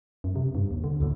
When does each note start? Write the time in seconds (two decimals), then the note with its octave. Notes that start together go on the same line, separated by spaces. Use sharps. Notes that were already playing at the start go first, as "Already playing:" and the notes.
0.24 F#2
0.36 C3
0.55 G2
0.71 D#2
0.84 D3
1.00 D2 A2